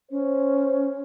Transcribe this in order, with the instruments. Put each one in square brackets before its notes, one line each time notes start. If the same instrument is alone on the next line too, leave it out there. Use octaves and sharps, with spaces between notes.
[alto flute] C#4 [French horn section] C5